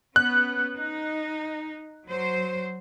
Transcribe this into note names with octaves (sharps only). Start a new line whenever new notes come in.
B3 C#4 F#6
D#4
F#3 C5